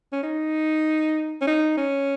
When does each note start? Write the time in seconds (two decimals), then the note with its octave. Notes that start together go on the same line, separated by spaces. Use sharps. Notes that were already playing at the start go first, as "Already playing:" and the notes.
0.12 C#4
0.23 D#4
1.41 C#4
1.47 D#4
1.77 C#4